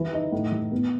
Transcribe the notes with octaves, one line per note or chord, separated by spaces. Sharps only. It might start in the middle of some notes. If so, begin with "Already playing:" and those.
Already playing: E3
D#4
A2
E3
B3